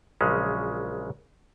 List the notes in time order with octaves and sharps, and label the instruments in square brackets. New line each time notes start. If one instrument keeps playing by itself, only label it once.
[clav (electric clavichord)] A#1 C#3 F#3 G#3 C#4